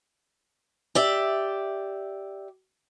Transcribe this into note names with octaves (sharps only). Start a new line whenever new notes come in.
G4 D5 E5